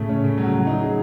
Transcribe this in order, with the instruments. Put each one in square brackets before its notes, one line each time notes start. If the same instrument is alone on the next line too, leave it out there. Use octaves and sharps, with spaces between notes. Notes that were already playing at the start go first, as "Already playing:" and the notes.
Already playing: [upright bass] A2 [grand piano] C#3 A3
[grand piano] C#4
C#3
F#3
F#3
D#4
G#4